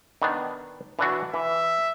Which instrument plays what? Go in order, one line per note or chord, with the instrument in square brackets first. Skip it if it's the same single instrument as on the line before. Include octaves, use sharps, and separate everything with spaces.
[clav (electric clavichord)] D#3 B3 D4
E3 D4 F#4
[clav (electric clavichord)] E3 [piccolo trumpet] E5